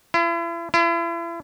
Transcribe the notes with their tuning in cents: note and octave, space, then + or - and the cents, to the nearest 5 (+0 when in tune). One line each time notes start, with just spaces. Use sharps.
E4 +40
E4 +40